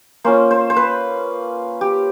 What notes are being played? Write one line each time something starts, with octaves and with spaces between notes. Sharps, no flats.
A#3 C#4 F4 C5
C5
C5
B4
G4